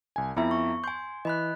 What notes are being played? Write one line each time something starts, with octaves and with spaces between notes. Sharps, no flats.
C2 G#5
F2 B3 E4 E5 A#5
C#6
G#5 C6 G6
E3 D#5 B5 F#6